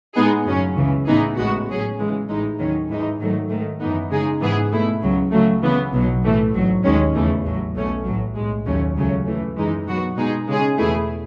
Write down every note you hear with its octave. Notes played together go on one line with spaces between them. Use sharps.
A2 G#3 B3 D#4 G#4
F#2 C#3 F#3 C#4
C#2 C#3 E3
A2 E3 B3 D#4 G#4
A1 A2 G#3 B3 F#4
A2 F#3 C#4 G#4
C#3 E3 G#3
A1 A2 E3 G#3 D#4
D#2 D#3 F#3 C#4
G#2 E3 G#3 D#4
G#2 D#3 F#3 A3
G#2 D#3 A3
F#2 E3 B3 D#4
C#3 G#3 D#4 G#4
G#2 E3 B3 E4 G#4
B2 A3 E4
C#2 C#3 F#3
C#3 F#3 A3
C#3 E3 B3
B1 B2 F#3
A2 E3 A3
A1 G#2 F#3
D#2 D#3 G#3 C#4
E2 C#3 E3 A3
A1 A2 F#3
B1 B2 A3 C#4
A1 A2 F#3
B1 A2 G#3
D#2 C#3 F#3 A3 C#4
C#2 C#3 F#3 A3 C#4
F#2 E3 A3
F#2 E3 G#3 D#4
B2 F#3 B3 F#4
B2 G#3 D#4 G#4
C#3 G#3 C#4 G#4
E2 B2 A3 E4 G#4